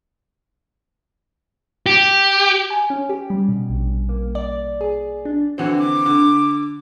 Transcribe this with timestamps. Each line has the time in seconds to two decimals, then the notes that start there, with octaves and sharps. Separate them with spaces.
1.86 G4
2.70 G#5
2.90 C#4
3.09 G4
3.30 G3
3.49 B2
3.69 A#1
4.09 A#3
4.35 D5
4.81 G#4
5.25 D4
5.58 D3 E3 C4 F#4
5.78 D6
6.06 D3